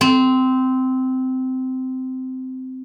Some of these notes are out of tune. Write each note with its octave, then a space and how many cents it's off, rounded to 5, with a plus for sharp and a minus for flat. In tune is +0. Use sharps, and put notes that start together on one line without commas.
C4 -15